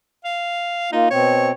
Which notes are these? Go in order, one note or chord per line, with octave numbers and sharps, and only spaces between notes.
F5
A#3 D#4 F4
B2 C4 C#5